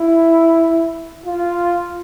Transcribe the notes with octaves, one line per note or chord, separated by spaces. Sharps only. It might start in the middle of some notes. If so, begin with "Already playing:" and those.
Already playing: E4
F4